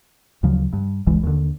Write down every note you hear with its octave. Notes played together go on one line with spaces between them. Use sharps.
D2 C#3 F3 F#3
G2
F#1 C#2 E3 G#3
D#2 D3